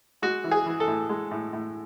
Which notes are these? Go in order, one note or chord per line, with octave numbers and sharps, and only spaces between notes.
G#3 F#4
E3
G#4
E3
A4
A2
G#3
A2
A2